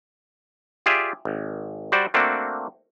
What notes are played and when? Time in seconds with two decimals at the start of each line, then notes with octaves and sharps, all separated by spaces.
0.86 F4 G4 G#4 D5 E5
1.25 G#1
1.92 G3 F#4 C5 D5
2.14 A3 A#3 C4 D4 F#4